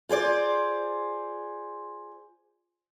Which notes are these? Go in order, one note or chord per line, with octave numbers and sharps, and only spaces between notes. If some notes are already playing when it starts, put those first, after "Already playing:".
F4 G#4 C5 D5